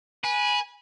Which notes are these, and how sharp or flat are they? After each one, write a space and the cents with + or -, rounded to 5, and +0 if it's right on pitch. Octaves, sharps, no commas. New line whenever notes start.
B4 -20 G#5 +0